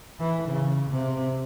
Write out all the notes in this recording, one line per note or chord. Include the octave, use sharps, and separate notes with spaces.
E3
C#3
C3